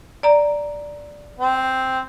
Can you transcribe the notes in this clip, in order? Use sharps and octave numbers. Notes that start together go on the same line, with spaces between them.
D5 A#5
C4